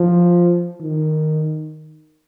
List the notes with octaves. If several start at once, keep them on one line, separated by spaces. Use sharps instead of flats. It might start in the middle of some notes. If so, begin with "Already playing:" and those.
Already playing: F3
D#3